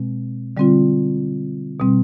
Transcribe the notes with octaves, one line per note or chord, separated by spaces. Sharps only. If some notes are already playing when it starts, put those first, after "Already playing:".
Already playing: B2 G#3 C4
D3 G3 C4 F4
B2 G3 C4